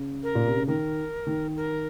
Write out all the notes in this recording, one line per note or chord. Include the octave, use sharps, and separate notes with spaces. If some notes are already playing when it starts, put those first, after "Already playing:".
Already playing: C#3
A#4
A#2
C3
C#3
D#3 A#4
D#3
A#4